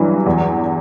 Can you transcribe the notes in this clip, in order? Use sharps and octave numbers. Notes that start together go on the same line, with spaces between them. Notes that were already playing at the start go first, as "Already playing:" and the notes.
Already playing: G2 E3 F#3
E2